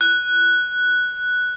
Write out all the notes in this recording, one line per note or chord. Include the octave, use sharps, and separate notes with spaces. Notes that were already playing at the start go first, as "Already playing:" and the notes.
F#6